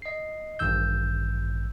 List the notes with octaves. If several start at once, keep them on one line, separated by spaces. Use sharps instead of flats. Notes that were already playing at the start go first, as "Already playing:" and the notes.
D#5 C7
A1 G2 D#3 E6 G6